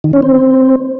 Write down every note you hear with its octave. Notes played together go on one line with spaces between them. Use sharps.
D#3
C#4
C4